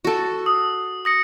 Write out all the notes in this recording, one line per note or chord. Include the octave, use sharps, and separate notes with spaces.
F#4 A4
D#6
D#6 A#6 C#7